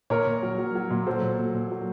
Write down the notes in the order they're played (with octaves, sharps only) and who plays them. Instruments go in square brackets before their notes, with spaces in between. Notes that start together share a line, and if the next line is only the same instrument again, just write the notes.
[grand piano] A#2 A#4 C#5
A#2
F#3
F#3
F#3
A#2
F#3 A4 C5
A#2
A#2
A#2
F#3